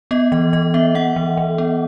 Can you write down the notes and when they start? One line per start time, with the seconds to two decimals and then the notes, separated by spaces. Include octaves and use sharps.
0.11 B3 D#5
0.32 E3 D#5
0.53 E3 D#5
0.74 B3 E5
0.95 B3 F#5
1.16 E3
1.37 E3
1.58 B3